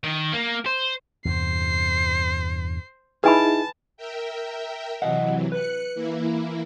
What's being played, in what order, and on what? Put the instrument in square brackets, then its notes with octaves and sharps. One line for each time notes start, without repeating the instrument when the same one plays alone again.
[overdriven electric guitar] D#3
A#3
C5
[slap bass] E2 G2 C3 [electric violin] C5 C7
[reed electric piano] D#4 E4 G#4 [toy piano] B4 G#5 B5 [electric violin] A5
[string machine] A#4 E5 G5
[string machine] C3 E3 F#3 [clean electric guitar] D#5 F#5
[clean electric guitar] B4 [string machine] F#6 C#7
[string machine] E3 A#3 E4